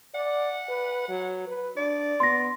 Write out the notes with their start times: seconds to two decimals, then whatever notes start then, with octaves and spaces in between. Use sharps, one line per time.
0.14 D5 F#5
0.69 B4
1.08 F#3
1.48 B4
1.77 D4 D5
2.20 B3 C6 A#6